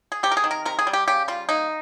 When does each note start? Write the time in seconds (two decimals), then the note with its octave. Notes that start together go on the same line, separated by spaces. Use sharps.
0.12 G#4
0.23 C3 G4
0.32 A#4
0.37 G#4
0.44 D#3
0.51 A#4
0.65 C3 A#4
0.79 G#4
0.87 G3
0.93 G4
1.08 C#3 G4
1.28 G3 F4
1.49 A#3 D#4